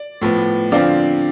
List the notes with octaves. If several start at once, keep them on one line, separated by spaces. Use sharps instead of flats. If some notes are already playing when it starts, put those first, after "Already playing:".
Already playing: D5
A2 F3 B3
D3 F3 C4 D5 F5